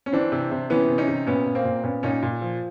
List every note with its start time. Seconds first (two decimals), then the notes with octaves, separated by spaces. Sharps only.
0.06 C#4
0.12 E3 C4 D4
0.32 C3
0.51 C3
0.70 E3 B3 C#4
0.88 C3
0.98 C#4 D#4
1.08 C3
1.27 A#2 B3 C#4
1.46 A#2
1.55 A#3 C4
1.65 A#2
1.83 A#2 B3 C#4
2.03 A#2 C#4 D#4
2.23 A#2
2.41 F3